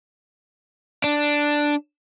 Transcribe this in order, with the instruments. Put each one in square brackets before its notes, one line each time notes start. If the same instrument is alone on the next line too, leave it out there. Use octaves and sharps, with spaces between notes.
[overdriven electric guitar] D4